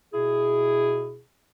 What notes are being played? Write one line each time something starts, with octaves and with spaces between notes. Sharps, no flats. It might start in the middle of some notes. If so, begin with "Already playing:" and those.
B2 E4 G#4